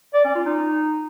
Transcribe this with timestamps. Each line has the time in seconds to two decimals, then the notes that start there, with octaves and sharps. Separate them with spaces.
0.14 D5
0.25 C#4
0.35 F4
0.46 D#4